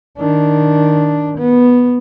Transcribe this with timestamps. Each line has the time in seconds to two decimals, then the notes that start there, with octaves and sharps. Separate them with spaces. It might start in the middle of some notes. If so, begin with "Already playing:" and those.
0.18 D#3 D4
1.38 B3